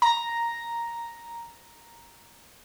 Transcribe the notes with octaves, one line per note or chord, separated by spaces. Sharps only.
A#5 A#6